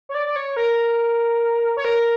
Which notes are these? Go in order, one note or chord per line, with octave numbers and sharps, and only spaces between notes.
C#5
D5
D5
C#5
A#4
C#5
A#4